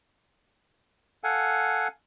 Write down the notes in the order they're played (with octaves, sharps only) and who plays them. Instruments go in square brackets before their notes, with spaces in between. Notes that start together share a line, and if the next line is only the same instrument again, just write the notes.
[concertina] A4 F5 F#5 G#5